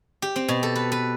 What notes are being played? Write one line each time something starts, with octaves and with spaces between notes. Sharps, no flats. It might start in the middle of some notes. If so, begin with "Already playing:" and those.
G4
C4
B2
A4
B4
B4